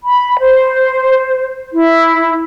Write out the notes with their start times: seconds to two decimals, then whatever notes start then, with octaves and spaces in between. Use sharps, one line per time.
0.03 B5
0.39 C5
1.74 E4